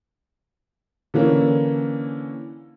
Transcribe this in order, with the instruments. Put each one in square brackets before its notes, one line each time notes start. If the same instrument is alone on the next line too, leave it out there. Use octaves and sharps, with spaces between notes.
[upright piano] D3 E3 A#3 C#4